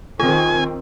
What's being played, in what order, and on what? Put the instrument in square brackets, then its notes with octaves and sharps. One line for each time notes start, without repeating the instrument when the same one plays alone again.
[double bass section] D#3 C4 [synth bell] F4 [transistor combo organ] G#5